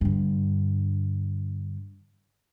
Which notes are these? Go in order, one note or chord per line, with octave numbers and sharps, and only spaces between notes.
G2 D3